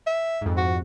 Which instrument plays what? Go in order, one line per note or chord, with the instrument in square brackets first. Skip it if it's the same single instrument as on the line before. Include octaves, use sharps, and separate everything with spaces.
[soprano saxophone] E5
[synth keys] F2 G#2
[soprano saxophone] F#4